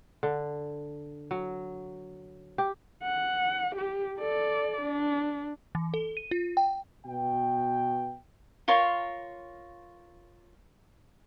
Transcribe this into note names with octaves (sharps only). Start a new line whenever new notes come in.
D3
F#3
G4
F#5
G4
A4 D5
D4
E3
A4
D#7
F4
G5
B2 G5
F4 A#4 C#5 C6